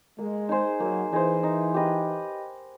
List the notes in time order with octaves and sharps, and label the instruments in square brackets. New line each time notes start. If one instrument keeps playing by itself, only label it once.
[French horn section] G#3 [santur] A#3
[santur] D#4 G#4 C5
[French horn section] F#3 [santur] A#3
[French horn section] E3 [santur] D#4 G#4 C5
[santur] D#4
G4 B4 D#5